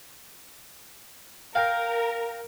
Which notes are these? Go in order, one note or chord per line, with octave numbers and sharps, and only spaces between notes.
A#4 F5 G5